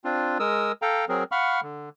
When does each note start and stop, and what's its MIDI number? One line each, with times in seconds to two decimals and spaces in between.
0.05 0.38 60
0.05 0.38 62
0.05 0.38 65
0.40 0.72 56
0.40 0.72 70
0.40 0.72 87
0.40 0.72 88
0.82 1.05 69
0.82 1.05 77
0.82 1.05 79
0.82 1.05 82
1.09 1.24 54
1.09 1.24 60
1.09 1.24 68
1.09 1.24 70
1.32 1.61 77
1.32 1.61 78
1.32 1.61 83
1.32 1.61 85
1.32 1.61 89
1.63 1.89 50